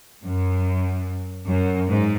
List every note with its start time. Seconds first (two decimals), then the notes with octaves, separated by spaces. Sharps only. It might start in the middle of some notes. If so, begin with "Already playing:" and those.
0.24 F#2
1.47 F#2
1.88 G#2